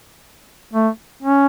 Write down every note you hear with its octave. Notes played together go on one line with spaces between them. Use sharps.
A3
C#4